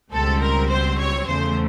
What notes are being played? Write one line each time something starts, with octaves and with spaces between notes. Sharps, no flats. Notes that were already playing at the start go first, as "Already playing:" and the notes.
C#2 B2 G3 C4 A4
A#4
C5
C#5
E2 C#3 F3 A3 C5